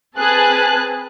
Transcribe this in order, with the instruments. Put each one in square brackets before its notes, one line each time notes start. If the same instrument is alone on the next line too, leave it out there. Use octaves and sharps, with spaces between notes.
[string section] C4 G#4 B4 A5 F#6